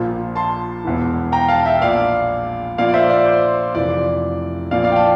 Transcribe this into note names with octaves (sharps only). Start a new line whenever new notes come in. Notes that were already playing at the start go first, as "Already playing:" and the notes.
Already playing: A#1 A#2 F3
A5 C6
E1 E2 E3
G5 A#5
F5 A5
E5 G5
A#1 A#2 F3 D5 F5
A#1 A#2 F3 D5 F5
D5
C5 E5
D5
C5
F1 F2 E3 D5
A#1 A#2 F3 D5 F5
D5 F5
G5
F5 A5